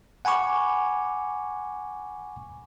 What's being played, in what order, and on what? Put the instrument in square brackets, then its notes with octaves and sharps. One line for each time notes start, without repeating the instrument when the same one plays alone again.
[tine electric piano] F#5 G#5 B5 C#6 D6